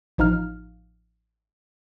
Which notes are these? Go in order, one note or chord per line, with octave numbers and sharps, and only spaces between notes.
A1 F3 D#4 F5 F6